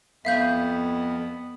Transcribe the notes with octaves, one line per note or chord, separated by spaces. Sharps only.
F2 B3 E5 F5 G6